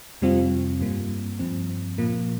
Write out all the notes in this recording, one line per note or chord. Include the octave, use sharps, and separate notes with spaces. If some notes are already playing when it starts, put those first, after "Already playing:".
F2 C3 G3 C4 F4
G2 G3 A#3
G2 F3 C4
A#2 F3 A#3